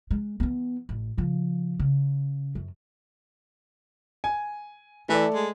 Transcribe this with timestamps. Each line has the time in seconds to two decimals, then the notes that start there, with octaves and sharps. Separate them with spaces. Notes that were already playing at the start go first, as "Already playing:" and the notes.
0.11 G#3
0.40 E3 B3
0.89 A1
1.17 C#3 F3
1.79 C#3
2.55 F#2
4.24 G#5
5.09 E3 A3 D5
5.35 G#3